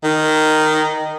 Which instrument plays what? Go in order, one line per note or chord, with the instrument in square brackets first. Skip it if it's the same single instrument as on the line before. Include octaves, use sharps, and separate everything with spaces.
[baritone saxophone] D#3